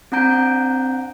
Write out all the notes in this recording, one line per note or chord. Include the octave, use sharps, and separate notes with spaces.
C4 D4 F#5 A#5 G6 D7